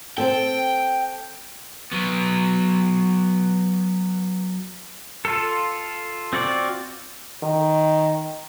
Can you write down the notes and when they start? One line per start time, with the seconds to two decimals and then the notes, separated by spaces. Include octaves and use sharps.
0.18 C4 A4 G5
1.92 F#3 B3
5.25 F4 A4
6.33 C4 F4 F#4 D5
7.43 D#3